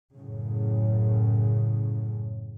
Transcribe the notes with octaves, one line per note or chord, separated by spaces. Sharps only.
F#2 A2 C#3